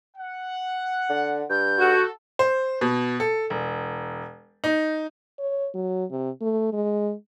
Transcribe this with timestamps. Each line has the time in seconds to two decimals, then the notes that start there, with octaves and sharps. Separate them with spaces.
0.16 F#5
1.10 D3
1.50 G2 G6
1.79 F#4 A4
2.39 C5
2.81 B2
3.20 A4
3.50 E1
4.64 D#4
5.39 C#5
5.74 F#3
6.11 C3
6.41 A3
6.73 G#3